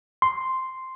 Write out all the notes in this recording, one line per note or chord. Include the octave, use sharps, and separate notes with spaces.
C6